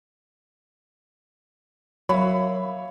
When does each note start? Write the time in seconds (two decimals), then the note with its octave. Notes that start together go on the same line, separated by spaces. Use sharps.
2.09 F#3 A#3 C#5 E5 B5